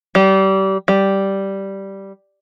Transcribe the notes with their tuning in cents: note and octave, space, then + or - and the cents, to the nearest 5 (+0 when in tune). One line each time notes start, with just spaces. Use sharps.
G3 -30
G3 -5